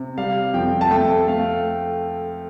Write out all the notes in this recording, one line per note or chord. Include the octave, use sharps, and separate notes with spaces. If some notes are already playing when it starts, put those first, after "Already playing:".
Already playing: C3
G3 F5
F2 G5
A5
A3 G5
A3 F5